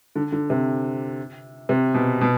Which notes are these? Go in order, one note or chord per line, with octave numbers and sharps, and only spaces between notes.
D3
D3
C3
C3
B2
B2